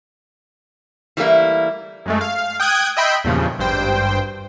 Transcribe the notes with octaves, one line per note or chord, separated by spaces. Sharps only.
E3 G3 A3 A#3 E4
F#2 G#3 A3
F5
G5 D#6 F#6 G#6
D#5 E5 G5 B5 C6
E2 G2 A#2 C#3 F3
G#1 G2 C5 G5